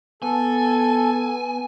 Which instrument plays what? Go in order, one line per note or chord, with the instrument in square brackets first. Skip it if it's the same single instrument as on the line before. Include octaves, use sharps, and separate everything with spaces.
[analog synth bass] B3 [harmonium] A4 [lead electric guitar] G#5